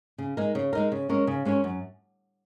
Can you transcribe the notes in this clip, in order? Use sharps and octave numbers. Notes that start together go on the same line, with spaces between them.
C#3
G#3 D#4 A#4
C#3
G#3 D#4 A#4
C#3
G#3 C#4 A#4 C#5
C#3
G#3 C#4 A#4 C#5
F#2